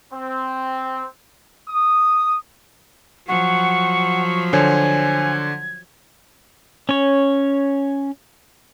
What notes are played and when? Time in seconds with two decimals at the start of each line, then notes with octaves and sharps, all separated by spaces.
0.13 C4
1.68 D#6
3.28 F3 F#3 F#5 C#6
4.53 D3 C5 C#5 G#5 G#6
6.89 C#4 C#5